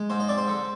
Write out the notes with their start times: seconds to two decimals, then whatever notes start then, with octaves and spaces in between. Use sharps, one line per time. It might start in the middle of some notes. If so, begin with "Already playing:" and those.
Already playing: G#3
0.10 G#2 C5
0.20 D#5
0.28 C4 D5
0.38 C5
0.48 D3